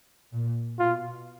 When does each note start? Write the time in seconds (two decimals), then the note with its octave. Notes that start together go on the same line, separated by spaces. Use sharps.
0.33 A#2
0.79 B2 F4